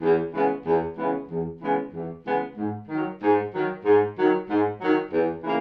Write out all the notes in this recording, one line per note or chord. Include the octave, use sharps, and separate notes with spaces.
E2
C#3 E3 G#3 B3
E2
C#3 E3 G#3 B3
E2
C#3 E3 G#3 B3
E2
C#3 E3 G#3 B3
G#2
D#3 F#3
G#2
D#3 F#3
G#2
D#3 F#3
G#2
D#3 F#3
E2
C#3 E3 A#3